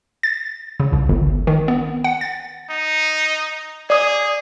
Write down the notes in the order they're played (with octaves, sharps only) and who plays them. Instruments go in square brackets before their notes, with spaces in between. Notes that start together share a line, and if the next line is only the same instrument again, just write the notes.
[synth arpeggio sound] A6
C#3
C2
G1
D#3
B3
F#5
A6
[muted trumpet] D#4
[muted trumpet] G#4 [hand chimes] D5 D#6